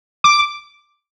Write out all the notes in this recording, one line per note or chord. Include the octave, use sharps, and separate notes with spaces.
D6